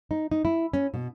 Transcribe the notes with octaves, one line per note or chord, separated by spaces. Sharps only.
D#4
D#4
E4
C#4
B2